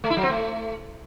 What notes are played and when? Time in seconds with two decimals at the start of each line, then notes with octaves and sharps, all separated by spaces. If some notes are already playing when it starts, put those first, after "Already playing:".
0.04 A3
0.10 E4
0.17 F#3
0.23 C4
0.30 A3